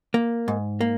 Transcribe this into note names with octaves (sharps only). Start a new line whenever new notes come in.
A#3
G#2
A#3